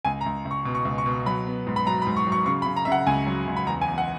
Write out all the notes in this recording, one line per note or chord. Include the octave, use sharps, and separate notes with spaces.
C#2 G#5
A#5
C#2
C#2
C#6
B2
C#6
C#2
C#6
B2
F#3 B5
B3
G#2
B5
F#3 A#5
B5
G#2
C#6
F#3
C#6
C#3 C#6
B5
C#3
A#5
C#3 E5
F#5
C#2 G#5
F#3
C#2
B5
E2 A#5
G#5
E2
F#5